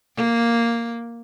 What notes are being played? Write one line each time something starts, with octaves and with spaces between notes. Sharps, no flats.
A#3